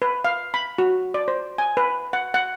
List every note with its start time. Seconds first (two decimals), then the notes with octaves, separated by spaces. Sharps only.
0.02 B4
0.25 F5
0.54 B5
0.78 F#4
1.14 D5
1.28 C5
1.58 G#5
1.77 B4
2.13 F#5
2.34 F#5